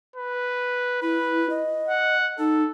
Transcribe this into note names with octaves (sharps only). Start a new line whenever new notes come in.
B4
E4 B4
D#5
F#5
D#4 A4